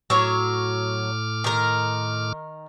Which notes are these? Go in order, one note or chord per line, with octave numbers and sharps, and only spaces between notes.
A2 F#3 C#5 D6 F6
D#3 A#4